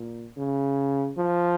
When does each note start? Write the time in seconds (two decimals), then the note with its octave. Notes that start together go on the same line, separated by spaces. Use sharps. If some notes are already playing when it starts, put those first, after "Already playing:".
Already playing: A#2
0.37 C#3
1.18 F3